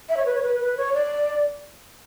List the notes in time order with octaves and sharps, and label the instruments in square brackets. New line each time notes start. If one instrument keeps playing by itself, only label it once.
[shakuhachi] E5
C#5
B4
C#5
B4
B4
C#5
D5